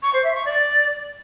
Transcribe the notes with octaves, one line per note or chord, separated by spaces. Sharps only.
C#6
C5
E5
C#6
D5